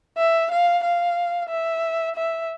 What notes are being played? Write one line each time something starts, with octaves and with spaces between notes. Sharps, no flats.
E5
F5
F5
E5
E5